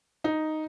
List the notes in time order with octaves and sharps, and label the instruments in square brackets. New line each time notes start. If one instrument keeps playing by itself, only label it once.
[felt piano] D#4